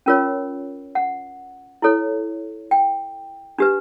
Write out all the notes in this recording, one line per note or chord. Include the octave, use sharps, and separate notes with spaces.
C#4 F4 A#4 C#5
F#5
E4 A4 C#5
G5
D4 G4 B4